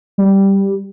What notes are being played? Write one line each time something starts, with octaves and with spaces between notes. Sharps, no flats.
G3